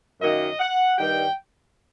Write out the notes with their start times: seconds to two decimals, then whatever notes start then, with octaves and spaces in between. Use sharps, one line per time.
0.21 F#2 D#3 F#3 A#3 D#5
0.59 F#5
0.98 G2 D#3 G3 G5